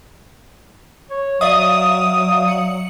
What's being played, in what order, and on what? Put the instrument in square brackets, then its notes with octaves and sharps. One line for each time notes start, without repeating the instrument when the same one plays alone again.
[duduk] C#5
[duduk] F#3 [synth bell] D5 E5 F5 [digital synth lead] D#6
[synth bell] C#7 F#7